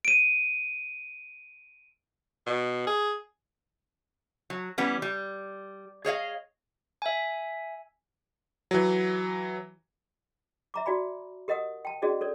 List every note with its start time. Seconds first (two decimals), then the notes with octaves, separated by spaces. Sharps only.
0.05 D7 D#7
2.46 B2
2.87 G#4
4.50 F#3
4.78 E3 G3 B3 C#4
5.02 G3
6.05 G#4 C#5 D#5 F5
7.02 E5 G#5
8.71 E3 F#3
10.74 E5 A#5 D6
10.86 F#4 D5 G#5 B5
11.48 G4 A#4 D#5 F#5 D#6
11.85 G5 A5
12.02 C#4 F#4 G#4 D5 D#5
12.21 C#4 A4 A#4 C#5 D5